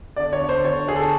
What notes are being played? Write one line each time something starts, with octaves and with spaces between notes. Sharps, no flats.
D3 D5
C#5
D3
C5
D3 C#5
D3 G#4
A4